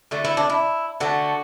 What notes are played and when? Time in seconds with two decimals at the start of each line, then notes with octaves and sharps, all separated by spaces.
0.11 D3 A3 F#4
0.25 E4
0.37 D4
0.50 E4
1.00 D3 A3 F#4